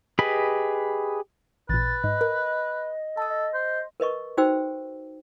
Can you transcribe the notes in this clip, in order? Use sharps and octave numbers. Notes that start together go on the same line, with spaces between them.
G4 G#4 B4 D#5 B5
A1 A#2 B4 A6
G#2 D#5
A#4
A4 A5 D#6
D#5
C5
A#4 B4 D#5 C#6
D#4 F#4 C5 G5 E6